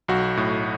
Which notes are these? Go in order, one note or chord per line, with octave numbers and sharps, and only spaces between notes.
B1 F#4
A2